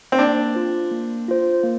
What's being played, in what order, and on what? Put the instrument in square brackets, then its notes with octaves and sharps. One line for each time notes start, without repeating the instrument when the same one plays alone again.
[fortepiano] C4
[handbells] A#3 [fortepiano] D4
[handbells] F4 C5
A#3
F4 C5
A#3